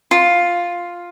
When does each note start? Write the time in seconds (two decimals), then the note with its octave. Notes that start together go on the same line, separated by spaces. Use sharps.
0.11 F4